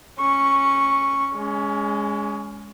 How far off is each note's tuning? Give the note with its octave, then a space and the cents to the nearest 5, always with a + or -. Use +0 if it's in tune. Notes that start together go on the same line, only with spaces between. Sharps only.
C#4 -15 C#6 +0
G#3 -5 C#4 +25